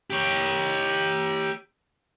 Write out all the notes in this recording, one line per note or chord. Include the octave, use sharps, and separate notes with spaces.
G4 C#5